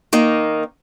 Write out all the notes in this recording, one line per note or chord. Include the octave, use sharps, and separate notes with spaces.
D#3 A#3 D#4